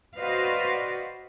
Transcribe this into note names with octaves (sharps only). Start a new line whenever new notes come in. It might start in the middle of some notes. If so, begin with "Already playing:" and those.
F#4 B4 C5 D5 D#5 F5